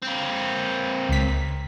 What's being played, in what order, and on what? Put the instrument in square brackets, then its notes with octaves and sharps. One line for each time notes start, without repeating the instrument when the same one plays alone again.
[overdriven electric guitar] A#3 C4
[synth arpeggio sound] C#2 B6